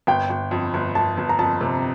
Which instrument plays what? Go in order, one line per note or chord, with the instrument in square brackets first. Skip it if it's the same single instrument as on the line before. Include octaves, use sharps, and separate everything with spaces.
[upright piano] G1 [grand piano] G5
[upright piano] G1
F2
G1
[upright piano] G1 [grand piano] A5
[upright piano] G1
[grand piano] A#5
[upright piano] F2 [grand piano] A5
[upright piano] C3